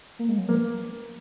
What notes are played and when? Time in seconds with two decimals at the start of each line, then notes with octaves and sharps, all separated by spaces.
0.19 A#3
0.29 G#3
0.38 F#3
0.48 F3 A#3